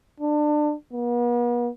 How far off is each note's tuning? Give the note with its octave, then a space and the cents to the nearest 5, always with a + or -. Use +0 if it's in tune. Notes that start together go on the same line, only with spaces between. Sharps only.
D4 +25
B3 -45